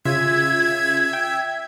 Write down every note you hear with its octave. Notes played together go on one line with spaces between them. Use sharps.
C#3 F4 E5 G#6
G5